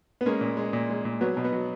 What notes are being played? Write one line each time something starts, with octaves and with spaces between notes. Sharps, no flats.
B3
G#3 A#3 C#4
A#2
G#3
A#2
G#3
A#2
F#3 B3
B2
B3
F#3